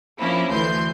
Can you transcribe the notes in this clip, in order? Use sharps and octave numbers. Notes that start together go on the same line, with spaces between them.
F3 A#3 C#4 D4 E4
D2 A2 E3 C6 G6